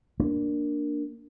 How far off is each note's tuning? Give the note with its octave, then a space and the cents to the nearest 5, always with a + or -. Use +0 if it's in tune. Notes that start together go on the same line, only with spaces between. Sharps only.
A#3 +0 D4 +0